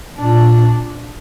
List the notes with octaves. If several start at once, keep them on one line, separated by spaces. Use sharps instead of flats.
A#2 D4